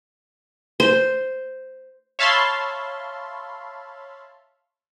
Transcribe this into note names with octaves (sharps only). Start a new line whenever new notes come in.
C5
C#5 E5 F5 A5 B5 C6